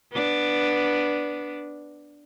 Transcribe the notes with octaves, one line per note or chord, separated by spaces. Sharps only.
B3 D4